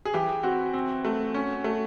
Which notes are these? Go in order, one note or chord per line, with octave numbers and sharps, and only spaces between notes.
G#4
E3 G4
C4 F#4
C4
A3
C#4
A3